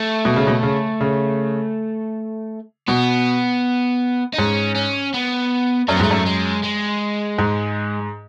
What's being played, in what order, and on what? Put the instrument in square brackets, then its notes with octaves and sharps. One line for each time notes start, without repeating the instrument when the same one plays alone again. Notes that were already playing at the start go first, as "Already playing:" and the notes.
Already playing: [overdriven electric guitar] A3
[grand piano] B2
C#3
B2
C#3
C#3
[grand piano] B2 [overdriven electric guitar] B3
[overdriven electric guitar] D#4
[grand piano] G#2 [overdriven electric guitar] C#4
[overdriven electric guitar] C#4
B3
[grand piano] F#2 [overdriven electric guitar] A3
[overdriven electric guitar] B3
[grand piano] G#2 [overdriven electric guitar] A3
[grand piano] F#2
[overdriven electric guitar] G#3
G#3
[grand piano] G#2